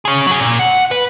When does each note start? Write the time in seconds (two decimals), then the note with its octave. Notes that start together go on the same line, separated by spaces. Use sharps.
0.05 C#4 G#4
0.27 F#3 G#4
0.40 A#2
0.59 F#5
0.91 B4